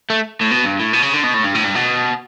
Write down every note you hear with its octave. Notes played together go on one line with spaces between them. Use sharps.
A3
A2
B2
G2
A2
B2
C#3
D3
B2
A2
G2
A2
G2
B2